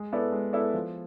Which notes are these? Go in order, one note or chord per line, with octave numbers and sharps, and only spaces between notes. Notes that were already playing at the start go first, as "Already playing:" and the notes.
Already playing: G#3
B3 E4 A4 D5
G#3
B3 E4 A4 D5
F3